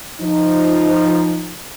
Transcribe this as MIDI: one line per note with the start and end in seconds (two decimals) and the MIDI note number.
0.21 1.55 53
0.21 1.55 63